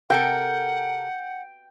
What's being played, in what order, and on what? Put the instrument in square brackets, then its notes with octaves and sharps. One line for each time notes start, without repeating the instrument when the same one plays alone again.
[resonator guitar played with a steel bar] C3 A4 A#4 [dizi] F#5 [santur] G5